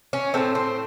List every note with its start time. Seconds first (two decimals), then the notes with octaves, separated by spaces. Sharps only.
0.13 C#4
0.34 A2 F#3 A3 C4
0.55 C4